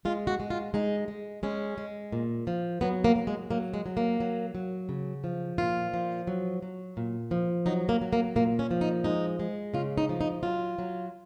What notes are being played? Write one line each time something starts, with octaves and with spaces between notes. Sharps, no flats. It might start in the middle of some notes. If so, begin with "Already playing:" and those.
G#3 F4
F#4
G#3
F4
G#3 D#4
G#3
G#3 C#4
G#3
A#2
F3
F#3 B3
A#3
F#3
G#3
F#3 A#3
G#3
F#3
A#3
F#3
F#3
C#3
F3
A#2 F4
F3
F#3
F#3
A#2
F3
F#3 D#4
A#3
F#3
A#3
A#2 A#3
C#4
F3
D#4
G#3 D#4
G#3
C#3 F4
D#4
F3
D#4
F#3 F4
F#3